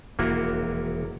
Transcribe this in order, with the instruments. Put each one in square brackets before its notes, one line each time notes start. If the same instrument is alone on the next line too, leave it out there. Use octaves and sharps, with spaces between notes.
[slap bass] E1 F2 C3 [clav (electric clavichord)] A#3 E4 F#4